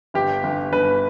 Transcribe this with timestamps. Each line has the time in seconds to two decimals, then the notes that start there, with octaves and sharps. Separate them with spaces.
0.14 G1 G4
0.43 G1
0.72 G1 B4